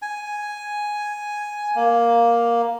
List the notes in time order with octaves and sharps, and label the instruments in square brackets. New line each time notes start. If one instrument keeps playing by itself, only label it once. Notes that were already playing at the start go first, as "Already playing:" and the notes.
[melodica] G#5
A#3